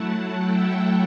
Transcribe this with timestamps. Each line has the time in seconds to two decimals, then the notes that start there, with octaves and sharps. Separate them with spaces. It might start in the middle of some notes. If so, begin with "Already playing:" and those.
Already playing: F#3 A3 E4 F#5 A5
0.37 E5 G5